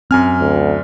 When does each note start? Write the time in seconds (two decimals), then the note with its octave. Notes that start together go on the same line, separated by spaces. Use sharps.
0.11 F#2 C4 G#5 F6
0.39 D2